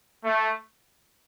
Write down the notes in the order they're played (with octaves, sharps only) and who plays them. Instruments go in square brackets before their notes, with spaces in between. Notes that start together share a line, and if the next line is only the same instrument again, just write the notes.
[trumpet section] A3